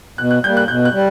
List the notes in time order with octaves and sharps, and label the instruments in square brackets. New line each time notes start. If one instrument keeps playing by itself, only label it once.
[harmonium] B2 [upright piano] F#6
[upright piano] F#6
[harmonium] G3 [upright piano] G6
[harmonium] A#3
[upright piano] F#6
[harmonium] B2 [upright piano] G6
[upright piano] F#6
[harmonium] G3